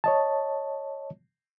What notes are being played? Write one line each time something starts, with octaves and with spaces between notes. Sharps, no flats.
C#5 D#5 A5